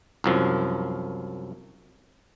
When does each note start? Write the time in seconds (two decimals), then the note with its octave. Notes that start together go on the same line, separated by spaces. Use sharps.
0.24 C2 F#2 F3